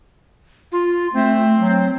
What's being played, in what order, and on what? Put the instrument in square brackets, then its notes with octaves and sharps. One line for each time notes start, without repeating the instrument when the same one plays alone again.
[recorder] F4
[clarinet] A3 [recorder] C4
[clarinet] F#3